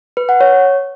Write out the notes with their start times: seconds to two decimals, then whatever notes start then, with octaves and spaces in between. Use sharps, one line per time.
0.17 B4
0.29 F#5
0.41 C#5